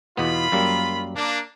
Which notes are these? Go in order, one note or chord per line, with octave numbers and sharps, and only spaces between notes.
E2 B2 B3 F4 B5
F#2 G3 A#3
A#3 D4